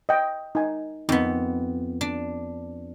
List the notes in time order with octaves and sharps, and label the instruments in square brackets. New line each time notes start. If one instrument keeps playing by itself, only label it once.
[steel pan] D#5 G5
D#4 G#5
[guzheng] F2 B3 [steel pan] D#4
[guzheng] D4